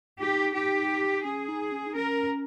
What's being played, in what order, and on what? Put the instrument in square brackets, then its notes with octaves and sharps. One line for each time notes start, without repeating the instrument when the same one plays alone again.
[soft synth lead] D#4 [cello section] G4
[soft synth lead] D#4 [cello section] G4
[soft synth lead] C#4 [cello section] G#4
[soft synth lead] D#4
C#4
D#4
[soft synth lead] C#4 [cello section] A#4